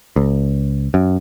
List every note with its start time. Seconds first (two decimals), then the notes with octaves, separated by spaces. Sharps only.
0.16 C#2
0.94 F#2